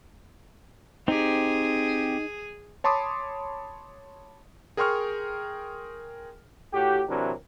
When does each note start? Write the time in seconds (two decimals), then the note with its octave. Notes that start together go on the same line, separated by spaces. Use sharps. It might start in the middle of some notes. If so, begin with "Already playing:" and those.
1.08 C4 D#4 G4 G#4
2.84 C#5 A5 B5 C6 D6 D#6
4.77 G#4 A#4 G5 C6 C#6 F6
6.73 A2 F#4 G4
7.09 C3 E3 F#3 D4 A#4